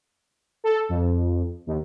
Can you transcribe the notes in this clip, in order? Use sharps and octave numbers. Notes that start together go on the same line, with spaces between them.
A4
F2
D#2